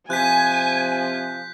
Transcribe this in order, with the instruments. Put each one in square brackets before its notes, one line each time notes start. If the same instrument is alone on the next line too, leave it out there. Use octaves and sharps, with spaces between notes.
[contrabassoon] C3 [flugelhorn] F3 [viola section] G#5 [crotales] F#6 G6 B6